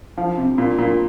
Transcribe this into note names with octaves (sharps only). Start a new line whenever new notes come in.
F3
C3
A#2
A#2